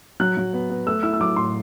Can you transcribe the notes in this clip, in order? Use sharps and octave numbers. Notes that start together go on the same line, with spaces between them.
F#3 F#6
F#3
B3
B3
A3 E6
E4 E6
E6
F#3 D6
A2 C6